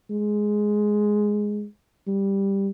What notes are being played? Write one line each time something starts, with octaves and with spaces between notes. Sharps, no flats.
G#3
G3